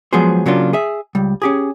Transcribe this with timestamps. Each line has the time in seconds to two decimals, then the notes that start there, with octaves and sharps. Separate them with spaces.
0.13 F3 F#3 G#3 B3 G#4 C5
0.46 C#3 F#3 A#3 D4 F4
0.73 G#4 E5
1.15 C#2 G3
1.42 C#4 G4 G#4